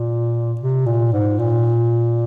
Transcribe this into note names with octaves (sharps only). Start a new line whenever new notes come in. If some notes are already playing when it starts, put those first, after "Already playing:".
Already playing: A#2
C3
A#2
G#2
A#2